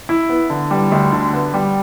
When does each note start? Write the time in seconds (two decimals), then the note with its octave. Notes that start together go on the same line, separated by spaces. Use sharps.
0.09 E4
0.29 B3
0.50 D3
0.71 G3
0.92 D2
1.12 D3
1.33 B3
1.54 G3